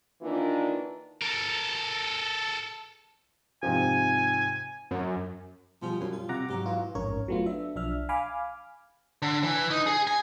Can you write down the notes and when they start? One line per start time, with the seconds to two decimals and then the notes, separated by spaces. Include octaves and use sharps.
0.22 D#3 E3 A#3 D4 D#4 F4
1.22 A4 A#4
3.63 G#2 C3 F3 G#5
4.91 F#2
5.82 B2 F3 G3 G#4
6.01 F#2
6.12 F4
6.29 C3 F#5 A#5 D6
6.49 G#2 F#3 G4
6.66 E3 F4
6.95 A1 F2 G#2 C#4 A#4 C#5
7.28 F#3 A3 B3 E4 F4
7.46 D4 E5
7.75 B1 F3 D4 E5 F6
8.09 F5 G#5 B5 D6 F6
9.22 D3
9.43 E3
9.70 D#4
9.87 G#4
10.07 G#5